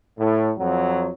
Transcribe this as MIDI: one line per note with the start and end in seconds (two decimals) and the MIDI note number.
0.19 0.50 45
0.58 1.09 41
0.58 1.09 54